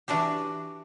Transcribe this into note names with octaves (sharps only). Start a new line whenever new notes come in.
E3 D4 F#4 G4